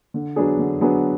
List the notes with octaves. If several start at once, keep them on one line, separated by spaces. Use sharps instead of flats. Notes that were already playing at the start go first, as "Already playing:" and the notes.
D3
F#3 B3 D4 G#4
D3
F#3 B3 D4 G#4